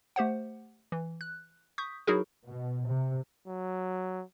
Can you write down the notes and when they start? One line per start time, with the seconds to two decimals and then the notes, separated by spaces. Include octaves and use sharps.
0.16 A3 G4 C5 F#5
0.92 E3
1.21 F#6
1.78 C#6 D#6 G6 B6
2.07 F#3 D#4 E4 F#4 G#4 A#4
2.46 B2
2.88 C3
3.48 F#3